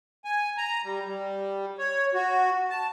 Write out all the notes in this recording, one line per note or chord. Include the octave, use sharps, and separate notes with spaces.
G#5
A#5
G3
G3
C#5
F#4
A5